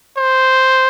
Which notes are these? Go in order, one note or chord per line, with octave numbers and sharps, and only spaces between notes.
C5